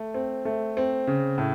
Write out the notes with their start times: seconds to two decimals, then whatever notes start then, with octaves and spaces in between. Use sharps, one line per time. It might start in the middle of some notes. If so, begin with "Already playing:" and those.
Already playing: A3
0.14 C4
0.45 A3
0.77 C4
1.07 C#3
1.38 A2